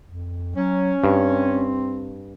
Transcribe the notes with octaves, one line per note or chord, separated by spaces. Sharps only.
F2
F#3 C#4
G2 C4